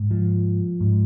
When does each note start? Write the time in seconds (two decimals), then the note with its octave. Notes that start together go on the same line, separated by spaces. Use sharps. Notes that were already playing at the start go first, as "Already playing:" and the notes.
Already playing: G#2
0.11 F3
0.80 G#2